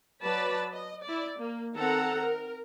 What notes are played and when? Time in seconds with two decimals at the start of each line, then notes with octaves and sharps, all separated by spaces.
0.23 F#3 B4 D5 A5 B5
0.73 D#5
1.04 E4 D5
1.38 A#3
1.75 D#3 C4 A4 F#5 A#5
2.24 A#4